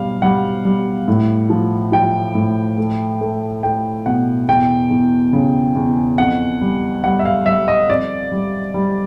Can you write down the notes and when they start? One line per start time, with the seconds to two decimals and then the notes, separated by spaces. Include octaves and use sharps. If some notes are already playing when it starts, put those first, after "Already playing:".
Already playing: B2 G3 F5
0.22 G3 F#5
0.65 G3
1.08 A2
1.50 F3
1.92 F3 G5
2.35 A2
2.78 A3
3.21 A3
3.63 A3 G5
4.06 B2 F#5
4.48 E2 G5
4.91 E2
5.33 C#3
5.75 E2
6.18 F2 F#5
6.61 G3
7.04 G3 F#5
7.19 E5
7.25 F5
7.46 G3 E5
7.68 D#5
7.90 F2 D5
8.32 G3
8.74 G3